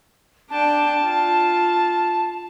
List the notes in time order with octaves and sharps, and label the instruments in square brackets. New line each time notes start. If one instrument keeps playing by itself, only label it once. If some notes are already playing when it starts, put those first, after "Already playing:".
[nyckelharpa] D4 G5 [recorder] A5
[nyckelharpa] F4